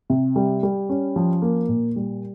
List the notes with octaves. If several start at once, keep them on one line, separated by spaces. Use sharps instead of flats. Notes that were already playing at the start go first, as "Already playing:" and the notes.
C3
G3
G3
C#4
F3
A#3
A#2
G3